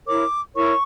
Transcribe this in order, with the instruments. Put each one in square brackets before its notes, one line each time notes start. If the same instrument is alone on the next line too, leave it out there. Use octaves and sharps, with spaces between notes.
[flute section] E4 A#4 C#5 D6
E4 A#4 C#5 C#6